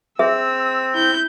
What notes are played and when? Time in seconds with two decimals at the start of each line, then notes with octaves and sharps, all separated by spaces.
0.19 C4 G#4 E5 E6
0.95 E4 G6